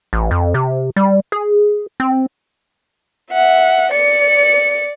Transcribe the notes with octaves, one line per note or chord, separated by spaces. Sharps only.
A1
F2
C3
G3
G#4
C4
E5 F#5
D5 C#7